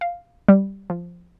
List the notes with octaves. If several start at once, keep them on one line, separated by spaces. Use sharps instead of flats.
F5
G3
F3